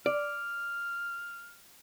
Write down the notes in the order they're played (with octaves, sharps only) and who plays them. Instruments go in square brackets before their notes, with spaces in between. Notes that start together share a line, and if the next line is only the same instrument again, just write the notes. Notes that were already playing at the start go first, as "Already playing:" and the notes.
[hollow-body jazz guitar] D5 [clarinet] F6